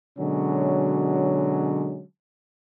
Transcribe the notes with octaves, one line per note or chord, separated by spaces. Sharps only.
B2 D3 F#3 G#3 C#4